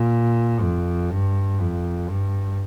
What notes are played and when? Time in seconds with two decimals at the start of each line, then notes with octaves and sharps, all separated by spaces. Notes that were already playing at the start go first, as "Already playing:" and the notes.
Already playing: A#2
0.61 F2
1.11 G2
1.60 F2
2.09 G2